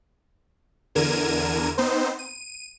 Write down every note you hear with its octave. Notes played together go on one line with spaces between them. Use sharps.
E2 D3 A#4 G#6 D#7 E7
B3 C4 D#4 C5
D#7